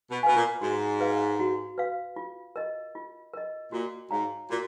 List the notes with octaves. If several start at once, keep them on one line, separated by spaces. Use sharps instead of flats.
B2
B2 B4 F5 G#5
A#2
G#2 F#4
B4 F5
F#4
B4 F5
F4
A#4 D#5
F4
A#4 D#5
A#2 F#4
G#2 C#5 F5 A#5
A#2 F#4